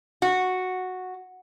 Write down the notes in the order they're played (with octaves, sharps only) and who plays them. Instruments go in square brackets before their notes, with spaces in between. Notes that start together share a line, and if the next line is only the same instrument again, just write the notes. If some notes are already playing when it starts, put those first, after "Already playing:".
[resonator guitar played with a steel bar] F#4